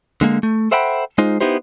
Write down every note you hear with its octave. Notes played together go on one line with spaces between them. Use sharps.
D3 G#3 A#3
A3
A4 C5 E5 F#5 G5 B5
G#3 D#4 F4 C5
B3 D#4 E4 G4 C5